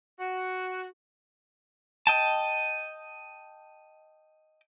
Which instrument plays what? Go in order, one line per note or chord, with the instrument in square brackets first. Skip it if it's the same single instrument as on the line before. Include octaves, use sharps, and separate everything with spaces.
[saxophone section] F#4
[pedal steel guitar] D#5 G5 A5